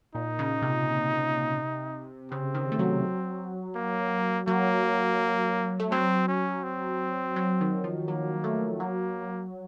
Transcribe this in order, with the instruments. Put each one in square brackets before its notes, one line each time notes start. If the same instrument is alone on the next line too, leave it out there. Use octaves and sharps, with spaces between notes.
[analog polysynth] A#2 [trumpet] D#4
[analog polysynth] C#3
C3
[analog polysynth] C#3 [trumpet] C4
[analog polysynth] D#3
A3
F#3
[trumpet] A#3
[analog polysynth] F#3 [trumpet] A#3
[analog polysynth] A3
[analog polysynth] F#3 [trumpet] C4
[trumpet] C#4
C4
[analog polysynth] F#3
D#3
F3
[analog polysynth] F#3 [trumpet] A#3
[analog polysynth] A3
[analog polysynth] F#3 [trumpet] A#3